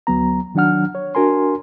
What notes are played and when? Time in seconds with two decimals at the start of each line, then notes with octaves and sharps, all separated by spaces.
0.07 D2 F#3 B3 A#5
0.55 D#3 F#3 D4 F#5 F6
0.95 C#5
1.15 D4 F#4 A#4 G#5 C6